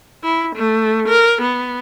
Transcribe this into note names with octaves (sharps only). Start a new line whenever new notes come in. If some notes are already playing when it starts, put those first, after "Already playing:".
E4
A3
A#4
B3